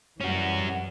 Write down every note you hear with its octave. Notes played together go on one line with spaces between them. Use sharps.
F#2 E3 G3 C#4 F#4